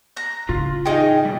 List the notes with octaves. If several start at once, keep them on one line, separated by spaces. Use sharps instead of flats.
A#5 F#6
A2 C#3 F4
D#4 G#4 D#5 G5
B2 G3